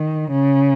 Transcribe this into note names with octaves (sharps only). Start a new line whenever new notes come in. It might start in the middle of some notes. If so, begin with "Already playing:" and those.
Already playing: D#3
C#3